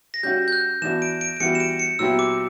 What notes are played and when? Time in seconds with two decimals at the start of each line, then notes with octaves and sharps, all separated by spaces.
0.14 A#6
0.23 G3 C#4 F#4 G6
0.48 G6
0.52 F#6
0.82 E3 B3 D4 F#4 E7
1.02 D7
1.21 D7
1.37 D7
1.40 E3 G3 B3 F#4 C#7
1.55 E7
1.60 D7
1.79 C#7
1.99 A#2 F#3 B3 E4 G4 E6
2.19 D6